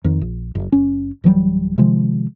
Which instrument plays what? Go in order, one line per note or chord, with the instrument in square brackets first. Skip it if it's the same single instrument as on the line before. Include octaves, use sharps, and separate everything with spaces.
[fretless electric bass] F2 D#3
A#1
F#1
F#1 C#4
D1 E3 F#3 G3
C3 D#3 F3 G#3